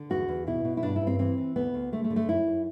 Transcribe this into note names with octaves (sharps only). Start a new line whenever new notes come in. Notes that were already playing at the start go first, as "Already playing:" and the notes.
Already playing: D3
E2 F#4
E2
B2 E4
B2
E4
G2 D4
E4
G2
C4
E3 C4
E3
D2 B3
D2
D3 A3
A3
D3
A3
F#2 E4
F#2